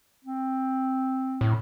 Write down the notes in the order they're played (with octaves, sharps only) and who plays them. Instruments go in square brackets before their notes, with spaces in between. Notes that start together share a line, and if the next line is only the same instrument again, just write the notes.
[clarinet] C4
[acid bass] A2